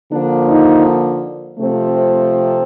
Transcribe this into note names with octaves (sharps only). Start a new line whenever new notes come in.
D3 F3 A#3 D4
D#4
C3 F3 A3 C4